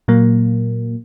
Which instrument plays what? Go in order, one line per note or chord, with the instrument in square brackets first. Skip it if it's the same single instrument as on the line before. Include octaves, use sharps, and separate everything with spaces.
[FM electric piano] A#2 F#3 A#3